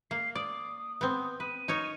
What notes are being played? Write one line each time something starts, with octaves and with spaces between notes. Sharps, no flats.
A#3 C7
D5 D#6
B3 C4
B4 D#7
D#4 A#4 C#5